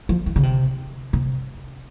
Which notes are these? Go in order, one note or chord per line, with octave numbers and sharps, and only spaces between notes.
F3
E3
C#3
C3
C3